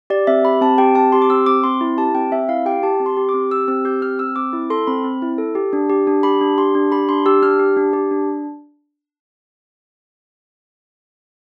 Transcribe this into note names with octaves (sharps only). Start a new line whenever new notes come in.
G4 D5
C4 E5
G4 B5
C4 A5
G4 G5
C4 A5
G4 C6
D6
C4 E6
C4 D6
C4 C6
E4
G4 A5
C4 G5
C4 E5
E4 F5
G4 G5
G4 A5
C4
C6
G4
D6
C4
G4 E6
C4 E6
G4 G6
C4 F6
C4 E6
C4 D6
E4
A4 C6
C4 B5
C4
E4
A4
G4
D4
G4
D4
G4 B5
D4
G4 C6
D4
G4 B5
D4 C6
G4 E6
D4 F6
G4
D4
G4
D4